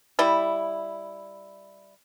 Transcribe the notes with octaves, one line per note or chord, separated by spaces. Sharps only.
G3 E4